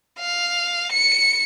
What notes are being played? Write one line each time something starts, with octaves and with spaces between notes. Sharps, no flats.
F5
C#7